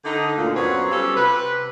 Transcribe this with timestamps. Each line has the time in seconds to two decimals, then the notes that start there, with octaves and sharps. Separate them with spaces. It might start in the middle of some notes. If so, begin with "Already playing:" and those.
0.05 D3 D#4
0.37 D2 A#2
0.55 F#2 F#3 B3 C4 C#5
0.90 G3 C#4 F4 G4 A4
1.15 C3 B4